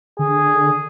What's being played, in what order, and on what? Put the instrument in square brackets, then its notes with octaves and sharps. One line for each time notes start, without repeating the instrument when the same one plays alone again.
[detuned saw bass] D3 [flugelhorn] G#4